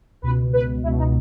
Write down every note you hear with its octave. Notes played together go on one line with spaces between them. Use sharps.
C#2 B2 B4
B4
C#2 B2 E4
D#4